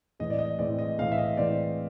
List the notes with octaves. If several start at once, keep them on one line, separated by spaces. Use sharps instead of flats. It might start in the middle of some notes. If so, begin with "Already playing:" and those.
A2 E3 G#3 C4 D#5
D5
D#5
A2 E3 G#3 C4 D5
D#5
A2 E3 G#3 C4 F5
E5
D#5
A2 E3 G#3 C4 D5